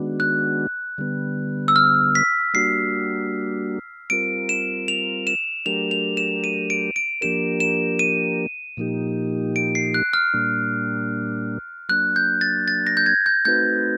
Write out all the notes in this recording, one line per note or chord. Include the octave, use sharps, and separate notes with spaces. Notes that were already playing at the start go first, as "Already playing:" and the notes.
Already playing: D#3 G#3 B3 D4 F#4
F#6
D3 G3 B3
E6
F6
B6
G3 A#3 D4 F#4 C7
G3 C4 F4 A#4 D7
E7
F7
E7
F#3 A3 D4 G4 A#4 F7
F7
E7
D#7
D7
D7
F3 A#3 D4 G4 A#4 E7
E7
D#7
A#2 F3 A#3 D#4 G4
D7
C7
F#6
F6
A#2 G3 A#3 D4
F#3 A#3 D4 F#6
G6
A6
A6
A#6
G6
G#6
G6
A3 C4 D#4 F#4 B4 G6